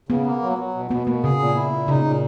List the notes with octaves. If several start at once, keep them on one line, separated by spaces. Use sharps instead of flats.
C#3 B3
A#3
F#3
F#3
B2
B2 B3
B2 A#3
C#3 G#4
A#2
E4
A#2
C#3 D#4
A#2